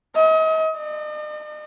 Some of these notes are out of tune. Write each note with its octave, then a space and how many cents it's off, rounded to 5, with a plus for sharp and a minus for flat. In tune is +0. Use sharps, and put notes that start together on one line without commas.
D#5 +35
D#5 -45